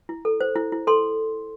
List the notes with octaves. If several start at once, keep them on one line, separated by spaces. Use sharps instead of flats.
E4
A4
C5
E4
E4
A4 C6